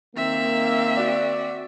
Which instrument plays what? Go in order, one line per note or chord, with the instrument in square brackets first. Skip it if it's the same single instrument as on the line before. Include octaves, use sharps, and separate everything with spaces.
[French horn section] D#3 A#3 [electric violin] C4 E5
[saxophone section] F#4 D5